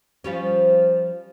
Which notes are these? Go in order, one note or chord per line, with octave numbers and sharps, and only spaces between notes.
F3 G3 C#4